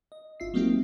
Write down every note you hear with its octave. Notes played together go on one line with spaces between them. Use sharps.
D#5
G1 F4 E5 C7
F#3 G#3 A#3 C4 D#4 G4